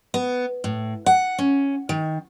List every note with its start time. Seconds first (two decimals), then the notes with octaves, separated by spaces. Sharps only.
0.14 B3
0.64 A2
1.06 F#5
1.38 C#4
1.89 D#3